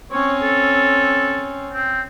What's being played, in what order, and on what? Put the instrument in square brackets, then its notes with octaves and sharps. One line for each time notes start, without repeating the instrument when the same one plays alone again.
[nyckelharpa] C4 C#4 [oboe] C#5
[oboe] A4
C4